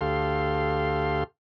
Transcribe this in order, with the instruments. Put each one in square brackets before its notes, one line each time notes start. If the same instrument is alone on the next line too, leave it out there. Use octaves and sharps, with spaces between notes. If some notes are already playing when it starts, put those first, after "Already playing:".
[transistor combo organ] D2 G4 A4 F5 C6